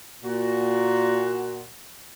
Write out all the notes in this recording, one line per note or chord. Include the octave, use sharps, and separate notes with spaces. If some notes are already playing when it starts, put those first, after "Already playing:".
A#2 F#4